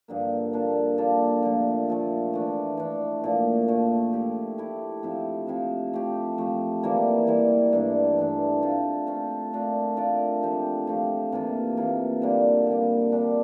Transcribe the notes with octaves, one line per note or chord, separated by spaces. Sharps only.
G2 D3 F3 A#3
A#3 D4 F4 A4
A#3 D4 F4 A4
A#2 F3 A3
A#2 F3 A3
E3 A3 D4
E3 A3 D4
A#2 F3 A3
A#2 F3 A3
A3 E4 G4
A3 E4 G4
C3 F3 C4 E4
C3 F3 C4 E4
F3 A3 C4 G4
F3 A3 C4 G4
E3 G3 A#3 E4
E3 G3 A#3 E4
G2 E3 A3 D4
G2 E3 A3 D4
A3 C4 F4
A3 C4 F4
A3 D4 F4 A#4
A3 D4 F4 A#4
F3 A3 C4 G4
F3 A3 C4 G4
C3 E3 A#3 F4
C3 E3 A#3 F4
D3 G3 A#3
D3 G3 A#3
C3 G3 D4 G4